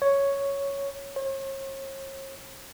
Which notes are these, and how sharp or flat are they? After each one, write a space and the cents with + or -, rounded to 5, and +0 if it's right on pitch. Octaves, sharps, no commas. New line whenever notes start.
C#5 +5
C#5 -40